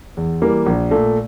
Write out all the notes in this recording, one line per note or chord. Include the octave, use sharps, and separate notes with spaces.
E2
E3 G3 A#3
A#1
A#2 A3